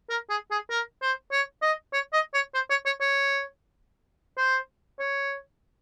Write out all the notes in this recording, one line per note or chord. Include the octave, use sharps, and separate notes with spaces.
A#4
G#4
G#4
A#4
C5
C#5
D#5
C#5
D#5
C#5
C5
C#5
C#5
C#5
C5
C#5